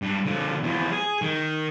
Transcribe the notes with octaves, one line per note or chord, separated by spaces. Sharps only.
G2
D3 F3
E2 F3
G#4
D#3